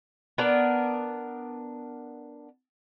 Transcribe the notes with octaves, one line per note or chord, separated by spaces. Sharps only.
B3 D4 A#4